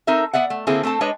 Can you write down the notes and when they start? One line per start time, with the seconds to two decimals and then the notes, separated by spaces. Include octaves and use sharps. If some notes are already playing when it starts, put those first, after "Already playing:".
0.07 C4 D#4 A4 A#4 E5
0.33 B3 D5 E5 F#5
0.50 A3
0.67 D3 A#3 C4 E4 G#4 A4
0.83 A3 C4 A4 A5
1.01 G#3 D4 B4 C#5 D#5